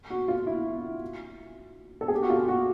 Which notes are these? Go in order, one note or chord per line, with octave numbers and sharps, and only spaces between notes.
F#4
F4
E4
A4
G#4
G4
F#4
F4
F#4